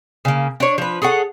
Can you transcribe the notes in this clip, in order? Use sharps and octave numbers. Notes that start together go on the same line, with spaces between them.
C#3 A#3
D4 C#5
F3 B4
G#4 A4 C#5 F#5